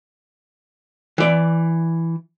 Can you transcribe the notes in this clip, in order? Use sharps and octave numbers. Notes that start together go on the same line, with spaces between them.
E3 D5